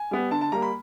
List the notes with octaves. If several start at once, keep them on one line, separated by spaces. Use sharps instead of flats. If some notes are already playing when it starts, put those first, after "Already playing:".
Already playing: G#5
G3 B3
D3 A5
A5
G3 A#3 A#5
B5